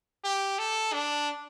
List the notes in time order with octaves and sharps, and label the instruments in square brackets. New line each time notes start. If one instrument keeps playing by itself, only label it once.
[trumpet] G4
A4
D4